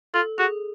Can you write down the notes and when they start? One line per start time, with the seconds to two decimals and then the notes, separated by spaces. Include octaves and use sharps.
0.14 F4 A4
0.38 F#4 G#4